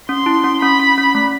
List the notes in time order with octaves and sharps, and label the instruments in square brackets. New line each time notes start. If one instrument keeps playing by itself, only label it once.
[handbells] C#4 [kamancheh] C6
[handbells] E4
C#4
[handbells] C#4 [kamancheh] B5
[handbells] C#4
C#4
A3